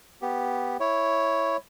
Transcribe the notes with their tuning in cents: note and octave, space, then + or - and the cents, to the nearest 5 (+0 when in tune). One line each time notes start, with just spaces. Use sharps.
B3 +0 G4 +0
E4 +0 C#5 +0